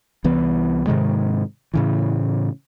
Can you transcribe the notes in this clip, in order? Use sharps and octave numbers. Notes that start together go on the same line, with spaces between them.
C2 E3 B3
G#2 C3 D#3 G#3
A2 C#3 E3